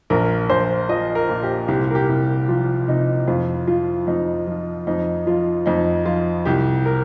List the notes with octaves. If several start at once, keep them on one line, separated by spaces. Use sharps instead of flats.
A#1 A#4
A#1 C5
F3 D#5
A#4
A#2
G4
C2 G4
A#4
G4
C2
F3 F4
C3 D#4
F2 F4
F3 F4
F2 D#4
F3
F2 D#4
F3 F4
F2 D#4
F3 F4
C2 G4
A#4